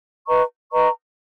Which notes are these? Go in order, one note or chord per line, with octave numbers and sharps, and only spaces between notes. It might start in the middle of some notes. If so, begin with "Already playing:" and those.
B4 D#5 A#5 C#6
B4 D#5 A#5 C#6